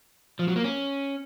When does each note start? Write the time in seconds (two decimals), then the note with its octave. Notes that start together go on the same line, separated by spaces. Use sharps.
0.39 F3
0.48 F#3
0.56 A#3
0.64 C#4